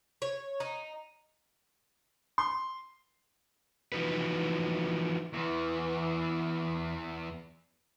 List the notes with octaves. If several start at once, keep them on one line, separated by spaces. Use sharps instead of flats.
C#5
D#4
C6
E3 F3 D#4 F#4 B4
E2 E3